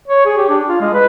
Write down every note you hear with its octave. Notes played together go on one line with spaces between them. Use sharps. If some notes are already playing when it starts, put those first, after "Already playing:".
C#5
G#4
G4
D4
F4
G#3
B4